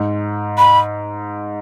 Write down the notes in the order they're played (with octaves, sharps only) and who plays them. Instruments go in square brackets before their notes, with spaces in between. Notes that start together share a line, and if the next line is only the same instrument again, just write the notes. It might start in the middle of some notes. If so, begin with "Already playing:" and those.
Already playing: [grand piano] G#2
[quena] B5